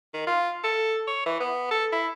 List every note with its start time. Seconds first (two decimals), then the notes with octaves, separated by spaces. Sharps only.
0.14 D#3
0.27 F4
0.64 A4
1.07 C#5
1.26 E3
1.40 B3
1.71 A4
1.93 E4